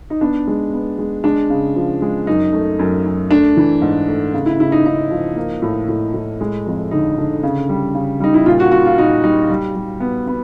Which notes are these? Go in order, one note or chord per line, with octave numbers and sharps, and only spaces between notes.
D#4
B3 D4
G#3
B3
G#3
G#3 D4
C#3
F3
G#3
F#2 D#4
A3
F#2
F#2
A3 D4
E3
G#2
A3
C#3
E4
C#3 E4
D#4
C#3 D#4
F3
A#3
A2
A2
A2
G#3
F2
D3 D#4
D3
C#3
G3
C#3
G3 D#4
E4
A#2 F4
F#4
A#2 F#4
F4
A#2 D#4
G3 D#4
G3
G3
B3
B3